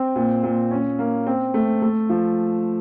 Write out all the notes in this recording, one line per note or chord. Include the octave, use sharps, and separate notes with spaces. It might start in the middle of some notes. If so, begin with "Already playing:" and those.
Already playing: C4
A#2
A#2
C#4
A#3
C4
A3
A3
F3